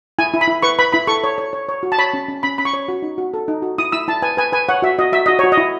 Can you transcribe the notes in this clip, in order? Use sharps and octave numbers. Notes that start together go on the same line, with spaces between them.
E4 G#5
E4
B5
E4
B4 C#6
B4 B5
E4 B5
A4 C#6
C#5
C#5
C#5
C#5
F#4
A5
C#5 B5
C#4
C#4
C#4 B5
C#4 B5
C#6
C#5
F#4
D#4
F#4
A4
D#4
F#4
E4 D#6
E4 E6
E4 A5
B4 G#5
B4 G#5
B4 G#5
C#5 F#5
F#4 E5
F#4 D#5
F#4 E5
F#4 D#5
F#4 C#5
D#5
E4